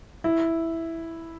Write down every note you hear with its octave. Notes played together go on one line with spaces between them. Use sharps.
E4